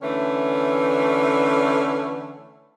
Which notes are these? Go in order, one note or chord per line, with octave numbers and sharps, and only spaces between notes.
D3 E3 A3 C#4